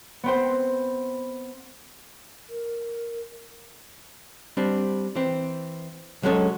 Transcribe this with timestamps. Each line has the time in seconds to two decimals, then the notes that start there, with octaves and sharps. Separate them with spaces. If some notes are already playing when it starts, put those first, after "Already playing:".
0.24 B3 C4 C5
2.49 A#4
4.57 G3 C4 D4
5.16 E3 C4
6.23 F#3 G#3 C#4 A4 C#5